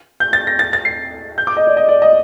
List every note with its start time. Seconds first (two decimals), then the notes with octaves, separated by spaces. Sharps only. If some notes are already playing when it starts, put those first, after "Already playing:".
0.20 G6
0.33 A6
0.47 A#6
0.59 A6
0.73 A6
0.85 C7
1.38 G6
1.47 D6
1.57 D#5
1.67 D5
1.77 D#5
1.89 D5
2.02 D#5